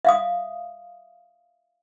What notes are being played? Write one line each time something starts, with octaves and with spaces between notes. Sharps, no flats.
E5 F5 D#6